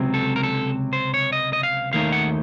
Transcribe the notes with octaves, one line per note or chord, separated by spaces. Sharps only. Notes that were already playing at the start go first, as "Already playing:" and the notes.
Already playing: C#2 C3 F#3 C4
A4
A#4
A4
C5
C#5
D#5
D#5
F5
D#2 D#3 A3 D#4 F5
F#5